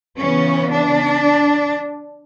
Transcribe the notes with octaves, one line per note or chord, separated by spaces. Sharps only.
C#3 E3 B3 C#4
D4